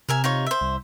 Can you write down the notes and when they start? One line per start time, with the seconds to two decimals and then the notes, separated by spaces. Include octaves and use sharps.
0.09 C3 A#4 E5 G#5
0.24 D#4 F4 C#5
0.46 C5 E5
0.61 C2